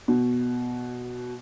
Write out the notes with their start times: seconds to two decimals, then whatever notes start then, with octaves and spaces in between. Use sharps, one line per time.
0.08 B2